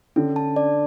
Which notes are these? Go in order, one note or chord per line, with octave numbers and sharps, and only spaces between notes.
D3 C#4
A5
D5